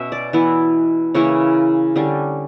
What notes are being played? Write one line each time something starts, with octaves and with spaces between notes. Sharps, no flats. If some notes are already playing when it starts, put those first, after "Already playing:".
Already playing: B2 C#4 E5
D5
E3 B3 E4
C#3 E3 A#3 E4 C#5
D3 G3 C#4